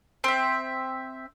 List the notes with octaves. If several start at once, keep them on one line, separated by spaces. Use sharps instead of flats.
C4 E5